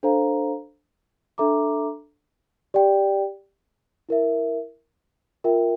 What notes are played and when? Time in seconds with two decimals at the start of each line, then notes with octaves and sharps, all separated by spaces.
0.03 D4 A4 C5 F5 A#5
1.38 D4 A4 E5 A#5 D6
2.74 G4 D5 G5
4.09 E4 A#4 E5
5.44 F4 A#4 E5 G5